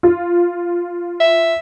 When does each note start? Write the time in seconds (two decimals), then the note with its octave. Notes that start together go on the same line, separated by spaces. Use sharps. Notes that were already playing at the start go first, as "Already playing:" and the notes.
0.03 F4
1.20 E5